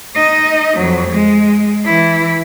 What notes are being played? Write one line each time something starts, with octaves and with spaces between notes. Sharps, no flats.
D#4 D#5
F2 F#3
G#3
E3 E4